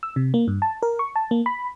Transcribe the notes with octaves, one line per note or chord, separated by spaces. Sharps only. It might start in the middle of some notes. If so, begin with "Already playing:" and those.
E6
C3
A#3
G2
A5
A#4
C#6
A5
A#3
B5